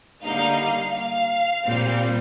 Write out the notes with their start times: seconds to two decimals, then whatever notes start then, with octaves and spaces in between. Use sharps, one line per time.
0.22 D3 G3 A#3 D#4 F5
0.94 F5
1.65 A#2 G3 C4